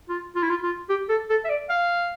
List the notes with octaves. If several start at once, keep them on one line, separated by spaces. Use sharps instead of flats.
F4
F4
E4
F4
F4
G4
A4
A4
E5
D5
F5